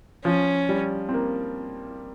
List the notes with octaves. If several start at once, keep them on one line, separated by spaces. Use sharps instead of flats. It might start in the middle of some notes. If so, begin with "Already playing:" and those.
F3 C#4
G3
C4
A#3